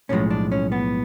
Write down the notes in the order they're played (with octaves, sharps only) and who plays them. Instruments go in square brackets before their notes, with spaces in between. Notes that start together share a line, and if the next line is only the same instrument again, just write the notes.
[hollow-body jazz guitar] B1 A2 F3 G#3 C#4
D4
C#4
B3